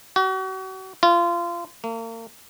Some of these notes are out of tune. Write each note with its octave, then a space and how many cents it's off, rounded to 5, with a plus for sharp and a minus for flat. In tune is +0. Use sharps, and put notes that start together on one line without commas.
F#4 +40
F4 -25
A#3 -40